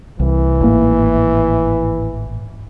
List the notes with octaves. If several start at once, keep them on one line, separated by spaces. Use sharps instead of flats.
C2 E3
G#1 A2 A#3